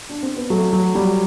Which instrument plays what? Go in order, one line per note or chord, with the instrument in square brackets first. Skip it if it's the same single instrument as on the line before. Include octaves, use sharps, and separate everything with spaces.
[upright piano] D4
C4
B3
[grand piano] F#3 [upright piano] A3
[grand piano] F#3
[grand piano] F#3 [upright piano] G3